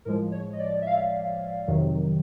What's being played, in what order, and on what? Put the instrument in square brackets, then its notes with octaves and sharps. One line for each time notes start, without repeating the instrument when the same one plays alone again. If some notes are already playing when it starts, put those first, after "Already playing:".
[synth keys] A2 F3 G#3 A#4
C#5
D#5
D5
E5
F5
F2 C3 D#3 F#3